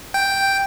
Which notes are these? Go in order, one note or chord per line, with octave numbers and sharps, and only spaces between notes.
G5